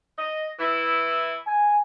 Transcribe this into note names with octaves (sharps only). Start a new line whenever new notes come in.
D#5
E3 E4
G#5